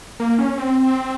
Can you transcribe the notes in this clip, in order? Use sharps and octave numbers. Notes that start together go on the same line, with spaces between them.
A#3
C#4
C4